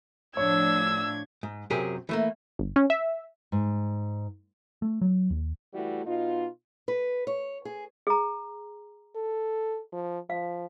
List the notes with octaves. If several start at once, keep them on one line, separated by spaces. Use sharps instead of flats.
A2 F3 D4 C#5 E6 G#6
G#2
F#2 C3 F#3 G4 G#4 A#4
E3 A3 A#3
G1
C#4
E5
G#2
A3
F#3
D#2
E3 G3 A3 E4 F#4
B2 D#4 F4
B4
C#5
G#4
G#4 A#5
A4
F3
F3 F5